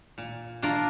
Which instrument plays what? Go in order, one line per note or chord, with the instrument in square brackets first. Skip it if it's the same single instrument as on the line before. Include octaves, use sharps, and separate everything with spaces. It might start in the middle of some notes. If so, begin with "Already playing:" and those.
[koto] A#2
A#3 D4 F4 A#4